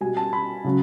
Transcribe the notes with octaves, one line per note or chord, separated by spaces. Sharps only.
B2 G3 G#5
A5
B5
C#3 F#3